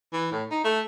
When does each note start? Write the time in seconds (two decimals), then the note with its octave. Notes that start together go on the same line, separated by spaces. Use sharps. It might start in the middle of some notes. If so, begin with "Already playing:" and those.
0.13 E3
0.32 A2
0.51 D#4
0.64 A3